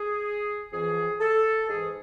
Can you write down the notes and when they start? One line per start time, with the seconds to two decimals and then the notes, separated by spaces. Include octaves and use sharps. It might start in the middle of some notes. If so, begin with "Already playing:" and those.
Already playing: G#4
0.72 F2 E3 G#4
1.20 A4
1.68 G#2 E3 G#4